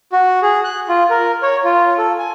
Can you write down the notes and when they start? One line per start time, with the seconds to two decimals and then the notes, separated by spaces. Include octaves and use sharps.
0.13 F#4
0.43 G#4
0.64 F#6
0.89 F4
1.11 A#4
1.43 C#5
1.64 F4
1.98 A4
2.18 G#5